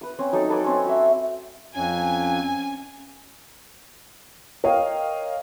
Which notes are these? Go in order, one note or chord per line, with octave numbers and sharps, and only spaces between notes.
B4 D#6
C4 C#4
F#3 D#4 A4 D6
A4 B4 G#5 D6
C4 C#4
F#4 E5
F2 C#4 G#5
A#4 C#5 D#5 F5 G5